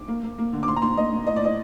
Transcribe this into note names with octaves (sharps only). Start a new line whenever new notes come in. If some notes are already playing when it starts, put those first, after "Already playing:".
Already playing: D6
A#3
A#3
A#3
D3
D6
A#2 C6
A#5
A#2 C6
A#2 D#5
A#2
A2 D#5
D5
A2 D#5